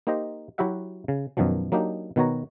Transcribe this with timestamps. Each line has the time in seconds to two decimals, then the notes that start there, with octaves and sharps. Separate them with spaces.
0.07 A#3 D#4 G4 C5 D#5
0.58 F#3 E4 F#4 G4 E5 F#5
1.08 C#3
1.37 F#2 B2 D#3 F3 F#3
1.72 F#3 A#3 D4 D#4 G4
2.16 B2 D#3 B3 F#4 C#5 A#5